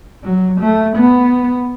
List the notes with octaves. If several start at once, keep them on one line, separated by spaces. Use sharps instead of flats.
F#3
A3
B3